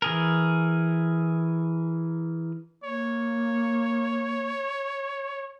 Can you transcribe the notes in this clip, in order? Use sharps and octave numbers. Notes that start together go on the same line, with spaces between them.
E3 G#4 A#4
A#3 C#5